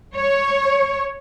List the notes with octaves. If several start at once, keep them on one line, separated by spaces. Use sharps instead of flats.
C#5